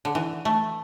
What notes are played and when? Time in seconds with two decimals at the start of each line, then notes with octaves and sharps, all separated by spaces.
0.05 D3
0.15 E3
0.45 A3